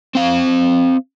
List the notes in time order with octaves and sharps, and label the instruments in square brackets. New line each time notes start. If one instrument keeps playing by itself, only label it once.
[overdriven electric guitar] C4 F5